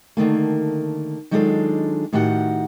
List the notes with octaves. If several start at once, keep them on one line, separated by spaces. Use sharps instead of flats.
D3 D#3 A3 A#3
D#3 F#3 G#3 D4 F4 A4
A2 D#3 F#4 G4 F#5